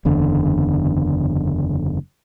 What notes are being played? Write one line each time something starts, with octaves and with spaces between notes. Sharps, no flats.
F#1 E2 D3